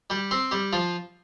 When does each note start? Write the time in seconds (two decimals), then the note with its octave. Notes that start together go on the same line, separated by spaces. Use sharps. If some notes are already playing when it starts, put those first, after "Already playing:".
0.10 G3 G4
0.31 C4 C5
0.51 G3 G4
0.73 F3 F4